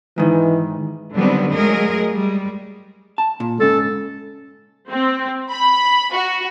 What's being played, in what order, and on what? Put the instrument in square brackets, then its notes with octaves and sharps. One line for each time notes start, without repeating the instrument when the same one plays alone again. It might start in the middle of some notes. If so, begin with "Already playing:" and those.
[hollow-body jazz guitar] G#2 D#3 [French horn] E3
[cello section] D3 D#3 F#3 G3 B3 C4
F#3 G#3 A3 G#4 A#4 D#5
G3 G#3
[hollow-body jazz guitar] A5
A#2
[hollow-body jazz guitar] G#2 C#3 [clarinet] A4
[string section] C4
B5
F#4